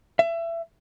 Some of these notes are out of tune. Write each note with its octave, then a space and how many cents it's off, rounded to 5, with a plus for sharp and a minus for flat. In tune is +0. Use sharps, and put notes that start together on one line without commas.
E5 +25